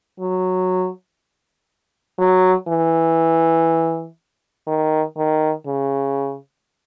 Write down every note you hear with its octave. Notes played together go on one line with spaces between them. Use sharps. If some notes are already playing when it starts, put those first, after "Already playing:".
F#3
F#3
E3
D#3
D#3
C#3